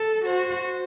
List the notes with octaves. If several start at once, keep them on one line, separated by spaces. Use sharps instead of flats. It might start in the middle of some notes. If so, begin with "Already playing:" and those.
Already playing: A4
F#4 C5